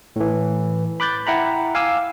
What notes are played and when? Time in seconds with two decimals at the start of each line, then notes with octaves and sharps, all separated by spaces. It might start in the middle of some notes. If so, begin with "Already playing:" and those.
0.16 A2 E3
1.00 B5 D6 F#6 G6 A6
1.27 E4 F#5 G5 A#5 B5
1.75 F5 G#5 D6 E6